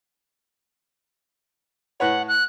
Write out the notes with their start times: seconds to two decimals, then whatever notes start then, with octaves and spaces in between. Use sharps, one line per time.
2.00 A2 B4 C#5 F#5
2.28 F#6